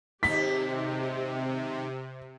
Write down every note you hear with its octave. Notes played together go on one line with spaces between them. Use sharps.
D#2 G#2 C3 D#4 G4 B6